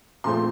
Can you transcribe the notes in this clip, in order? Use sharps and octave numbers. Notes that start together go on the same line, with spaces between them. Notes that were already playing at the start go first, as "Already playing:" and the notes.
A#2 F3 A3 C4 C6